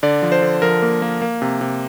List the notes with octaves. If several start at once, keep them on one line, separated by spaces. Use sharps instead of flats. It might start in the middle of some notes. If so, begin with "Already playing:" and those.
D3 D5
F3
C5
D3
F3 A#4
A#3
A#3
A#3
C3
C3